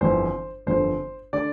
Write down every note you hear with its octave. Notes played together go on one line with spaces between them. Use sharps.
G1 F2 E3 C5
G1 F2 D3 C5
D3 D5